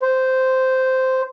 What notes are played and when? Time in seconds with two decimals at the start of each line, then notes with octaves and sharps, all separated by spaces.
0.02 C5